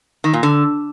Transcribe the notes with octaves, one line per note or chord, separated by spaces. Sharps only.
D#3
A#2
D3